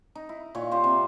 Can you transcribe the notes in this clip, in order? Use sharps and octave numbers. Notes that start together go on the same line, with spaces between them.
D#4
E4
A#2 D#3 C#5
F4 G4 C5
C3